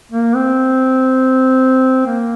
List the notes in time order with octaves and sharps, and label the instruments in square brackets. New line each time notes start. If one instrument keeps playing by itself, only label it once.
[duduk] A#3
C4
A#3